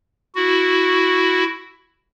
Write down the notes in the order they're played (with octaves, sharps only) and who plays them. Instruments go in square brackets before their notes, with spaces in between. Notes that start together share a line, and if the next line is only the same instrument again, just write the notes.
[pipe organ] E4 F#4